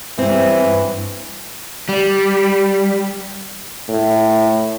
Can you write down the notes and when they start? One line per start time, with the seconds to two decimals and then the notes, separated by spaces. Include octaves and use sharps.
0.18 E3 G3 C4
0.64 G2
1.89 G3
3.90 A2